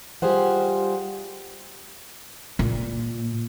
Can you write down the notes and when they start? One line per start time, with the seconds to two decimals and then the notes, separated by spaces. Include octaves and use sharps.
0.22 G3 F4 G4 G#4 C5 F#5
2.59 A#2